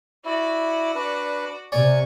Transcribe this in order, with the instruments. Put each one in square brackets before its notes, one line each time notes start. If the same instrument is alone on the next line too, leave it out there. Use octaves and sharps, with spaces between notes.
[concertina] E4 [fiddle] F#4 D5
[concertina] D4 B4
[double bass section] C3 [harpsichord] C#5 D5 [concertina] G#5 C#6